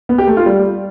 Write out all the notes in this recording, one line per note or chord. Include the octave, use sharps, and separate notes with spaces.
B3
G4
A3
F4
G3